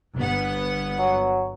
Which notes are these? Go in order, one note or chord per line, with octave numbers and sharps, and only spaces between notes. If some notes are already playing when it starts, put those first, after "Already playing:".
G1 B3 F#5
F#3